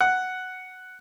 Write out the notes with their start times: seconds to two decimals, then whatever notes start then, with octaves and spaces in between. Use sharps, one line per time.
0.01 F#5